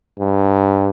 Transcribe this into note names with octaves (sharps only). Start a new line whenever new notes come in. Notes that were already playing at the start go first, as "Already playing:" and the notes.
G2